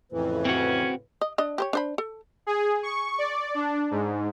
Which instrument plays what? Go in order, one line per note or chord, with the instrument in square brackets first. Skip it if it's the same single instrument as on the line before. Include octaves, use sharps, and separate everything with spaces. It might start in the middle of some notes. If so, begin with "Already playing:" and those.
[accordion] F2 E3 [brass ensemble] A2 C#3 B4
[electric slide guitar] C4 F#4 [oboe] C#4
[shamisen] D#5
D4 D#5
G4 C5 C#5
D4 C5 B5
A4
[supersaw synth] G#4
C#6
D5
D4
G#2